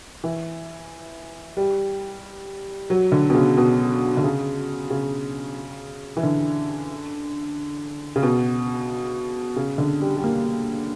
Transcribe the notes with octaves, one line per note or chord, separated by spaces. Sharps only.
E3
G3
F#3
D3
B2
C#3
B2
D3
C#3
C#3
E3
D3
C#3
B2
C#3
D3
G3
G3
A#3